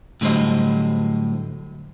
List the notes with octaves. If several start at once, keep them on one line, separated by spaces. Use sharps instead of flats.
A2 D3 F#3 G3 C5 D#5